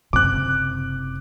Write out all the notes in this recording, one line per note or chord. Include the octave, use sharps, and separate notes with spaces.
F#1 C3 D6 F#6